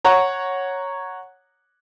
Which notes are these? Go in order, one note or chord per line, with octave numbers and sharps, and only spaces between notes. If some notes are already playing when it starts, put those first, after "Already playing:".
C#5 F#5 A#5